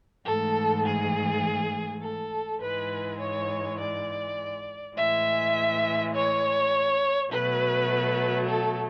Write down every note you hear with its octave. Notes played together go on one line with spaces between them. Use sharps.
G#2 E3 A3 A4
G#4
A4
G#2 E3 G#3 B4
C#5
D5
A2 E3 G#3 E5
C#5
B2 F#3 A3 B4
A4